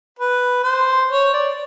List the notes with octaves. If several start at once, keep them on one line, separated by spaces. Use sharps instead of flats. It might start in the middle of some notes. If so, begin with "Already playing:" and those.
B4
C5
C#5
D5